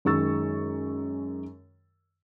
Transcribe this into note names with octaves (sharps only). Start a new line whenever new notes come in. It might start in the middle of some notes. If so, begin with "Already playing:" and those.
F#2 D#3 G#3 C#6 E6 A6